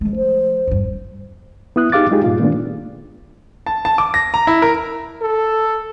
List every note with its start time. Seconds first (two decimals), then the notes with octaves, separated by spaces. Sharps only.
0.01 F3 G#3 A3
0.16 C5
0.67 E2 G2
1.76 B3 E4 D#6 F#6
1.92 D#4 G4 G#4 F5 D6 A6
2.11 G#3 D#4 F4 G4 G#4
2.24 G2 A#2 F4
2.40 A#2 D#3 A3 B3 D4
3.66 A5
3.85 A5
3.98 D6
4.14 A#6
4.34 A#5
4.47 E4
4.62 A#4
5.22 A4